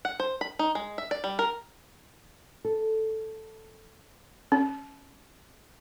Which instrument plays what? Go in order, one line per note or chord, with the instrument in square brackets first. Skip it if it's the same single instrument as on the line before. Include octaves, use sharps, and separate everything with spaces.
[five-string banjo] F#5
C5
B5
D#4
G#3
E5
D5
G3
A#4
[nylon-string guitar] A4
[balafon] C#4